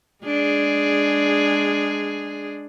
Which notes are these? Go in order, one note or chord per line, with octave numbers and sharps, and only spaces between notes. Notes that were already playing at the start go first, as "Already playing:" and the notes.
G#3 D4 G#4